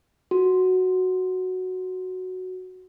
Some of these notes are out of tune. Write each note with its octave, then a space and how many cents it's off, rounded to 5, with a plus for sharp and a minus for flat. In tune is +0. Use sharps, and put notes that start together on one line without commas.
F#4 +0